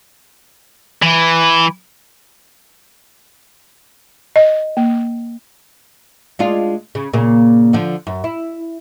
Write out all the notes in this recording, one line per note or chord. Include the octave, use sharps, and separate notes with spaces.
E3
D#5
A#3
G#3 D4 F4
C#3
A#2 C#3 A#3
D3 F3
F#2
E4